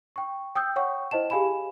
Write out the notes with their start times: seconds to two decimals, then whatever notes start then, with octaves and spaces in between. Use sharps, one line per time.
0.16 G5 C#6
0.55 G5 D#6 E6 G6
0.76 C#5 F#5 G5 C#6
1.11 E4 C5 D#5 A5 E7
1.30 G4 G#4 F5 G#5 B5 E7